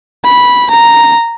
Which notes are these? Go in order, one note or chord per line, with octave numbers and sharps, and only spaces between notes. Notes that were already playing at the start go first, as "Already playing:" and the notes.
B5
A#5